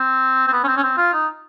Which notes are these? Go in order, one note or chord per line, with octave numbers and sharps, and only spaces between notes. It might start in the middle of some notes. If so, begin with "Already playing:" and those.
Already playing: C4
C4
B3
C#4
C4
C#4
C4
F4
D#4